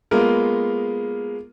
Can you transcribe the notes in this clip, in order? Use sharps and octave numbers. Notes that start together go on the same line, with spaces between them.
G#3 A#3 B3 F4 A#4